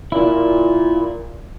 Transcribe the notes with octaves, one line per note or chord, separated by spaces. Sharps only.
A#2 E4